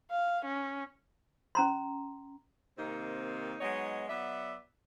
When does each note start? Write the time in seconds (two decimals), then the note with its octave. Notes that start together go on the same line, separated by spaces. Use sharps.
0.11 F5
0.45 C#4
1.55 C#4 A#5 C6
2.78 C3 D#3 A#3 C4 D#4
3.61 F#3 G#3 B3 D#4 C#5 D#5
4.09 F#3 B3 D5 E5